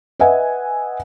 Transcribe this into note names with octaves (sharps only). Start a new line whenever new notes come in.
B4 D#5 E5 F#5 G#5